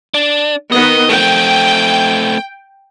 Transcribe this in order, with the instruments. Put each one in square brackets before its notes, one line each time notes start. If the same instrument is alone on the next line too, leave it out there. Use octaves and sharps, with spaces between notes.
[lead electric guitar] D4
[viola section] D#3 B3 [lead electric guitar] D#5
[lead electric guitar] A3 C4 [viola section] G5